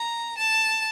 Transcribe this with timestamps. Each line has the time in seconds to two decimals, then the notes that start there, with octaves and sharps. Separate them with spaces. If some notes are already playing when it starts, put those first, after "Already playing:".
Already playing: A#5
0.38 A5